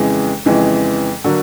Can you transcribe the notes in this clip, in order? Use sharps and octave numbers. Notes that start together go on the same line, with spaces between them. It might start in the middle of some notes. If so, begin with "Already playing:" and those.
Already playing: F2 C#3 E3 G#3
F2 C#3 E3 G#3
D3 F#3 A#3